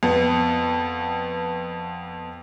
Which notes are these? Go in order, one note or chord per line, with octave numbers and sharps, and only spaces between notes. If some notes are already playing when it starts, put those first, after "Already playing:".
F2 B3